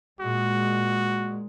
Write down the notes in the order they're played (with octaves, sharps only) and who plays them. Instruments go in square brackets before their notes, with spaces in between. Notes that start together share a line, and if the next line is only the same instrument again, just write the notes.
[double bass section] A#2 G#3 [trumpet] F#4